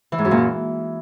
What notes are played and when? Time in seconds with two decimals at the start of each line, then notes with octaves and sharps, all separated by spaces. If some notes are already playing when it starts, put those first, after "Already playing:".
0.12 E3
0.18 G#2
0.25 F#2
0.31 A#2
0.37 E3